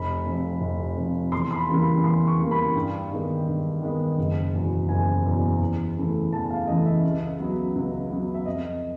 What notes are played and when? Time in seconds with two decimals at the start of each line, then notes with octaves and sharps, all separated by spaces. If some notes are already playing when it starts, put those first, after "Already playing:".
Already playing: F1 B5
0.26 F2 C3 F3
0.61 F1
0.97 F2 C3 F3
1.32 E2 C6
1.51 C6
1.56 B5
1.69 C#3 E3 G3 A#3
1.80 B5
2.04 E2 C6
2.27 C#6
2.39 C#3 E3 G3 A#3
2.51 B5
2.76 G2 G5
3.11 D#3 G#3 B3
3.47 G2
3.82 D#3 G#3 B3
4.18 F#1
4.54 E2 B2
4.89 F#1 G#5
5.24 E2 B2
5.61 E2
5.97 C#3 E3 A3
6.33 E2 A5
6.50 F5
6.67 C#3 E3 A3 D#5
6.86 E5
7.04 C#2
7.39 C#3 F#3 B3
7.75 C#2
8.10 C#3 F#3 B3
8.34 E5
8.46 F2 D#5